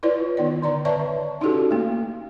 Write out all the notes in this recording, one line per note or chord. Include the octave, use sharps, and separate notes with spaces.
E4 F4 B4 C#5 D5
D#3 B3 D#4 D5
D3 D5 A#5
B4 C#5 D5 E5 A5 C#6
C#4 D#4 E4 F#4 G4 A4
A3 A#3